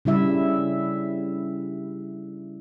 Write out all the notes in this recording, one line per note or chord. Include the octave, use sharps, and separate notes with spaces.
C#3 G3 E4 E5